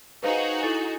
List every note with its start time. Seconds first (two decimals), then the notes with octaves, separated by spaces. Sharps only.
0.23 D#4 F#4 G#4 B4 C5 F5
0.63 E4 A4 A6